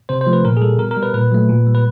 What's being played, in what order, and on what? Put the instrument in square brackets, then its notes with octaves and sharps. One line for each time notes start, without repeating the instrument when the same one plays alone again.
[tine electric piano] C3 C5
C5
F3 A3
B4
A#2 A#4
G#4
G3 A4
B2 A#4
A#4
G3
B4
A#2 B4
F#3 A3
A#2
G3
B4